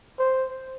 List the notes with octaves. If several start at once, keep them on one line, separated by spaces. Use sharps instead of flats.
C5